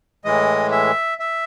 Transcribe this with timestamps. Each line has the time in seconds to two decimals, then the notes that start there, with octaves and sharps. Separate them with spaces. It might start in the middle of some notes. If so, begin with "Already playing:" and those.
0.25 A2 E3 G#3 D#5
0.72 E5
1.20 E5